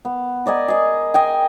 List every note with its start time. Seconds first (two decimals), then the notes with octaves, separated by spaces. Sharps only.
0.05 B3
0.46 A#4 D5 D#5 G#5
0.68 G#4 D#5
1.14 D#5 G5 G#5